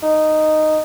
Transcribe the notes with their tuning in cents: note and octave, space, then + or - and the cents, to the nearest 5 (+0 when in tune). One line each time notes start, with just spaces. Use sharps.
D#4 -10